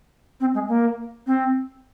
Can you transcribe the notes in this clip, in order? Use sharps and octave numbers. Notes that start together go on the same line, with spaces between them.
C4
G#3
A#3
C4